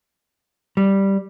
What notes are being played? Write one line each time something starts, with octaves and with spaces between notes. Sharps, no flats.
G3